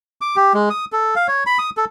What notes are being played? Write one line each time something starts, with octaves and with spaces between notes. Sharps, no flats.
D6
G4
G#3
D#6
A4
F5
C#5
B5
D#6
A4